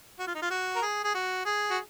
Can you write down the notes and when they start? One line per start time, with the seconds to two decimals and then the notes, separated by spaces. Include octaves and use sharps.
0.20 F#4
0.27 F4
0.35 D#4
0.42 F4
0.51 F#4
0.76 A#4
0.82 G#4
1.04 G#4
1.14 F#4
1.46 G#4
1.70 F#4